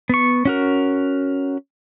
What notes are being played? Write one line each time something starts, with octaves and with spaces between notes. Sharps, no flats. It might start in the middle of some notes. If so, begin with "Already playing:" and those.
B3 C#6
C#4 F#4 A#4